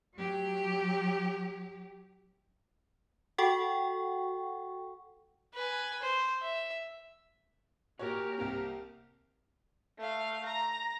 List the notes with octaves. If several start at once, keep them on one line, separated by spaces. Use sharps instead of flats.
F#3 G4
F#4 A4 F#5 G5 C#6
B4 G#5
C5
E5
A#2 F#4 G4 A#4 C#5
C2 A#3 C4
A3 F5
A#5